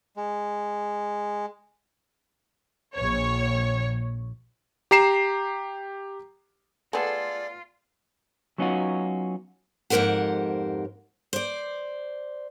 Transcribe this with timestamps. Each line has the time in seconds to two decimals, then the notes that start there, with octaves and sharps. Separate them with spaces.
0.16 G#3
2.94 A#1 C#5
4.91 G4 A#5 C7 E7
6.93 A3 B3 F4 G#4 A4 D5 C6
8.58 F#3 B3 C#4 D#4 F4 F#4
9.90 F2 G#2 G4 A#4 C5 F#5
11.33 C5 D5